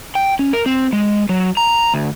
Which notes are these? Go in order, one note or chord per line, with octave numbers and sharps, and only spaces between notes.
G5
C#4
A#4
C4
G#3
F#3
A#5
D2